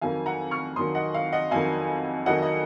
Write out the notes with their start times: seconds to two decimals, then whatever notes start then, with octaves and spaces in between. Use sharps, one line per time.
0.01 F2 D#3 F#3 F5 G#5
0.26 F#5 A#5
0.51 C#6 F6
0.76 F2 D#3 F#3 C6 D#6
0.95 D#5 F#5
1.14 F5
1.32 D#5 F#5
1.51 F2 D#3 F#3 F5 G#5
2.26 F2 D#3 F#3 D#5 F#5
2.42 D#5